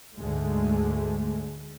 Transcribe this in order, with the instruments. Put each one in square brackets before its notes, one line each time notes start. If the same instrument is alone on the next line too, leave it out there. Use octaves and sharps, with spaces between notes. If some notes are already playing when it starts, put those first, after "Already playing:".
[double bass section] D2 G#2 D3 G#3 A3